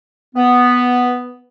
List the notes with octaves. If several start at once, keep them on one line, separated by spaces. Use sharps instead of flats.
B3